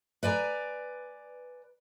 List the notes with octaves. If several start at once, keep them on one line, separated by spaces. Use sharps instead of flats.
B4 D5 G#5 A#5